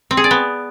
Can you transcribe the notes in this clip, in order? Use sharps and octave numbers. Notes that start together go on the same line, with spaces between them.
C4
G#4
D5
B3